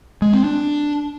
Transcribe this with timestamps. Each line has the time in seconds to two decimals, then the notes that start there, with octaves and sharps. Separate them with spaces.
0.22 G#3
0.33 C4
0.44 D4